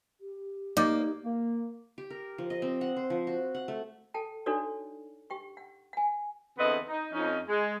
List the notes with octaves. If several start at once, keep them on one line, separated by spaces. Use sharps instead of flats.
G4
A#3 D#4 D5
A#3
G4
A#4
F3
D#5
C4
F#5
C5
F3
F#4
F#5
A3
A4 G5 A5
D4 D#4 F#4 A4 C#5 D5
G4 G5 C#6
F#5
F#5 G#5
E2 D3 B3 C4 B4 D#5
D#4
F2 C#4 D#4
G#3